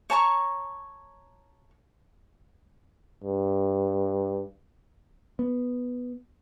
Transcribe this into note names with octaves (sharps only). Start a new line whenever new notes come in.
C#5 A5 A#5 C#6
G2
B3